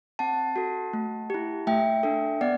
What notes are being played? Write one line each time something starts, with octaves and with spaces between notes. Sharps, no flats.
C4 F#5 A5
F#4 A4
A3
E4 G4
A3 E5 G5
D4 A4
B3 D5 F#5